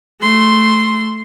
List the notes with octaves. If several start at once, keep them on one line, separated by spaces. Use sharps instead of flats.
A3 C6